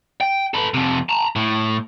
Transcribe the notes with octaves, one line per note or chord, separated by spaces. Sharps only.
G5
A4 B4
F2 C3
A5 A#5
A2